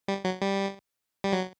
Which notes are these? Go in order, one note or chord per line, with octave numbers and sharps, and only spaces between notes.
G3
F#3
G3
G3
F#3